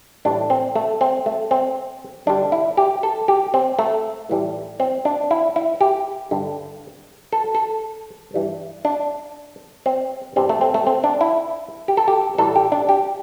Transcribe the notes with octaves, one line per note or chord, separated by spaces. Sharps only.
A2 E3 G3 D4
C4
A3
C4
A3
C4
G2 D3 G3 D4
E4
G4
A4
G4
C4
A3
A2 E3 G3
C4
D4
E4
E4
G4
G2 D3 G3
A4
A4
G2 E3 G3
D4
C4
G2 E3 G3 C4
A3
C4
A3
C4
D4
E4
G4
A4
G4
A2 E3 G3 A4
G4
D4
G4